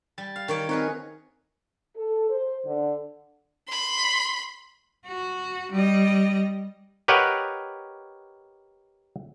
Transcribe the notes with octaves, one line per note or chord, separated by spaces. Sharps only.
G3 A6
F5
D#3 C#5 D5
C4 D#4 G#4 A#4 B4 C#5
A4
C5
D3
B5 C6
F#4
G3 D#5
G4 A#4 B4 C#5 D#5 F#5